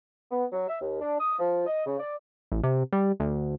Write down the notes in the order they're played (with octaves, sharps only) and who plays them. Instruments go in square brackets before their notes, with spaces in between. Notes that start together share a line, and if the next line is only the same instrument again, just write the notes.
[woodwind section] B3
F#3
E5
D#2
D4
D#6
F3
D#5
C#3
D5
[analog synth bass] A1
C3
G3
D2